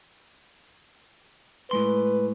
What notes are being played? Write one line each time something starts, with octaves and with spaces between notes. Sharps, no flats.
A2 G#3 B4 C6